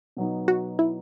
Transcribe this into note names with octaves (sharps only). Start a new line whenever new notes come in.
B2 F#3 B3 D#4
F#4
E4